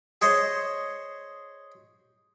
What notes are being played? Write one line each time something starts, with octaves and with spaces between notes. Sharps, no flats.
G#4 C5 C#5 D#5